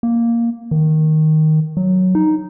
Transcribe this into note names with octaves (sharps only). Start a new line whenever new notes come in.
A#3
D#3
F#3
D#4